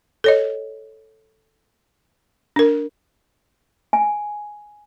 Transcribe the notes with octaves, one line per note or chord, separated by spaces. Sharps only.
A4 C#5 D#5
D4 A#4
G#5